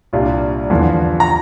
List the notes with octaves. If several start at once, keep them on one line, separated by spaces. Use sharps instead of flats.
C2 A#2 G3 D4 F4
E2 D3 F3
A#5